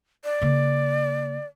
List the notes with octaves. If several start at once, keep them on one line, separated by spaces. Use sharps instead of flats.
D5
C#3 A#3